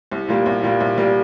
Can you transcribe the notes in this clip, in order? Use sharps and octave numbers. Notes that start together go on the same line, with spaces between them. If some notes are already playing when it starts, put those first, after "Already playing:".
C2
A#2 G3 A#3
C2
A#2 G3 A#3
C2
A#2 G3 A#3